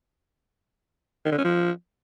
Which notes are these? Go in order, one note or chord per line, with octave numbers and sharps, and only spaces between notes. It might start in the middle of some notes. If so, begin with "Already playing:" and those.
D#3
D3
C#4
F3